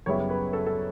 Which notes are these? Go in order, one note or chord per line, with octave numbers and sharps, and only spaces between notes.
F#2 C#3 G3 B3 E4 C#5
B4
A4
A4